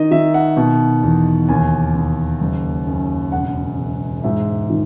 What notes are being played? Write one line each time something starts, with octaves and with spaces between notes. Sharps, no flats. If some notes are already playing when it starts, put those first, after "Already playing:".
Already playing: D#3 D#5
D#3 E5
F#5
B2
E2
D#2 G#5
D#2
F#1
F#2
E1 F#5
E1
G#2 E5
D#3